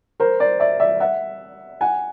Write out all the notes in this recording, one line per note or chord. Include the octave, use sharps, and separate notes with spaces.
A#4 C5
C5 D5
D5 E5
D5 E5
E5 F#5
F#5 G#5